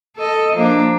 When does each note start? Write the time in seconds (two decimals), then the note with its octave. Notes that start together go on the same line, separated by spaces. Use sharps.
0.17 A4 D#5
0.55 F3 A#3 D4